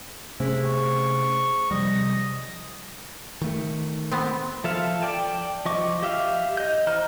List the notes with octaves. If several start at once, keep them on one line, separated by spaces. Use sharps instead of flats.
C3 A3 C#4 E4 G#4 C5
C#6
C3 F3 G3 D#5
D#3 A3
B3 C4
F3 A4 E5 F5
D5 G5 A5
F3 D#5 C#6 D6
G4 E5 F5
D#5 G6
E3 C5 D#5 A#5 F6